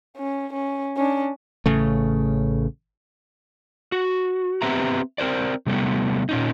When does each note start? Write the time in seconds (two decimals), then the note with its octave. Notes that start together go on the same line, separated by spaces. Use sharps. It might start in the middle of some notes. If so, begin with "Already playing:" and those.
0.17 C#4
0.53 C#4
0.97 C#4 D4
1.66 A1 C#3 A3
3.92 F#4
4.62 B3 C4 G4 B4 E5 A#5
5.18 C4 A#4 C5 D5
5.66 C3 G3 A3 B3
6.29 A#2 C#4 D#4